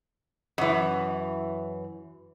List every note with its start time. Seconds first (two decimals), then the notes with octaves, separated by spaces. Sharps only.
0.58 F#2 E3